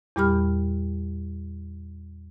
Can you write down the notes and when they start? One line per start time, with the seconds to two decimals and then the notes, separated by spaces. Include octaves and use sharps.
0.16 E2 A#2 G3 G4 B5 F6